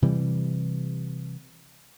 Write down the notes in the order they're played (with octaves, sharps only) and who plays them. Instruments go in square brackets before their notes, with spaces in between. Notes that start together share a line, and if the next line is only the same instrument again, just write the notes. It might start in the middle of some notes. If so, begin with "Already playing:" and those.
[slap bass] C3 E3 G3